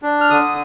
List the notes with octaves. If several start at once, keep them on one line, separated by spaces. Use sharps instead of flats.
D4
F6
D3 D#6